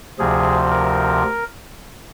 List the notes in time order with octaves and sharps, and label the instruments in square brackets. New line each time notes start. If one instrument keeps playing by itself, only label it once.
[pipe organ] D2 C3 F3 G#4
A#4